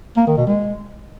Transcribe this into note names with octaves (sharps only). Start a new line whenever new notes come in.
A#3
D#3
B2
G#3